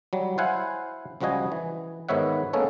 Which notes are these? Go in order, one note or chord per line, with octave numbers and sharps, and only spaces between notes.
F#3 G3
E4 C5 F5 F#5 G#5
C#2 F3 G3 F#4 D#5 G#5
E3
G#2 D#3 B3 C#5 E5 F#5
G#3 A#3 B3 C#4 A4 C#5